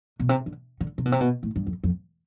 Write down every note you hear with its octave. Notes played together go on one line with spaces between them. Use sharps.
B2
C3
D3
D3
C3
B2
C3
B2
A2
G2
F2
F2